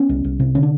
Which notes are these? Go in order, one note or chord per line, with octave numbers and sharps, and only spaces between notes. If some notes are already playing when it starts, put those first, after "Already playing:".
Already playing: B3 C#4
C2
C2
C3
D3 C#4
D4